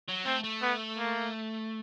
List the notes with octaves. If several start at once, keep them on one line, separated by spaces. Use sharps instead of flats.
F#3
A3 C4
A3
B3
A#3